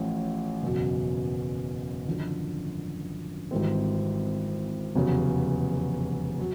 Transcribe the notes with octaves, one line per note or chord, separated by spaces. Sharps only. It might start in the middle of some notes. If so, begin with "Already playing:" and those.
Already playing: A1 A2 F3
F#1 E2 B2 F#3
G#1 F#2 D3 F3
G#1 G#2 E3 G3 C4
F1 E2 C#3 F#3
F#3